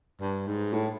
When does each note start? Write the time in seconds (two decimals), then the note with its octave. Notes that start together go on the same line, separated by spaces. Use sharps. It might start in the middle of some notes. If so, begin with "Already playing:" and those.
0.21 G2
0.48 G#2
0.74 A2